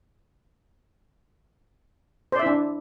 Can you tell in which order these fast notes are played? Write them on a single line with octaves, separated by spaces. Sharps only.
C5 D5 E5 E4 D4